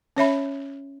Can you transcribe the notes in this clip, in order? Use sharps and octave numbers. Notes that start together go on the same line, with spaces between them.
C#4 C#5 E5 B5